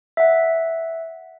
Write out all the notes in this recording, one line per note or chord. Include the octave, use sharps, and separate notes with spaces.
E5 F#5